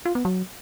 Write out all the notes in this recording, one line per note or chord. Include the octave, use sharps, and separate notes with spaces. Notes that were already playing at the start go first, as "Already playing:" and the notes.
F4
B3
F#3